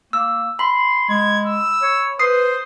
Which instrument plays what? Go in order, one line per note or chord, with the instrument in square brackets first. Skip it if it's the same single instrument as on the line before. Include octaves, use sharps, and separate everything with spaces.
[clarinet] A#3 [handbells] E6
[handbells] B5 [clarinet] C6
[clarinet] G#3 [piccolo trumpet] G#6
[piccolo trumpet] E6
[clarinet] C#5
[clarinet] B4 [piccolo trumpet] C5 [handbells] D#6 C7